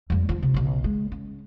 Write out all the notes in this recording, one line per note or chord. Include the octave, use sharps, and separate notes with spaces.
F2 G3
F3 D4
C3
B1 C#3
G#3
C#4